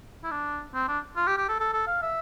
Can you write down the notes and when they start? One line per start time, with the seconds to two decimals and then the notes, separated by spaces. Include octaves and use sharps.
0.24 E4
0.31 D4
0.74 C4
0.89 D4
1.16 F4
1.27 G4
1.37 G4
1.49 A4
1.60 A4
1.73 A4
1.87 F5
2.03 E5